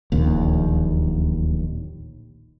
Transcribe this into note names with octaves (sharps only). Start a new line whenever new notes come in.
D1 A#1 D#2